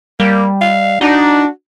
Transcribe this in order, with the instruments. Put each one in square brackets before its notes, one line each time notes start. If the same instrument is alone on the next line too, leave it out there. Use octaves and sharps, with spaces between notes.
[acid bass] G3 [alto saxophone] A#3
[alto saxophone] F5
[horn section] D4 [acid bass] D#4 [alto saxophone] F#4